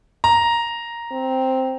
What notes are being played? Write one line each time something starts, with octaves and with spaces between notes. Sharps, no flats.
A#5
C4